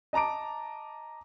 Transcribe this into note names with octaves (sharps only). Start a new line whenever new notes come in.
D#5 A5 A#5 D6 D7